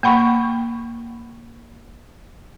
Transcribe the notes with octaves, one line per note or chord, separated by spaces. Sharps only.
A#3 F#5 B5 C#6